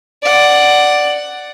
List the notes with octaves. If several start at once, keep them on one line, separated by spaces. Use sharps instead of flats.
D5 F#5